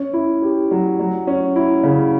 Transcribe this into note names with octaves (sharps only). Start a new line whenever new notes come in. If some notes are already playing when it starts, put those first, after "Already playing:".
Already playing: C#4
E4
G4
F#3
F#3
C#4
E4
C#3